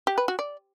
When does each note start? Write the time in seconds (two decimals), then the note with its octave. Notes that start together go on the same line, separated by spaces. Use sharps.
0.07 G4
0.18 B4
0.28 F#4
0.39 D5